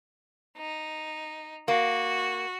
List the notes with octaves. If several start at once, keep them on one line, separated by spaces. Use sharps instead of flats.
D#4
A#3 F#4